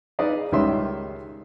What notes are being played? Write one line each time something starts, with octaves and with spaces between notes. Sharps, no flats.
D#4 G#4 B4 D5 D#5 F5
C#2 D#3 G3 C#4 E5 C6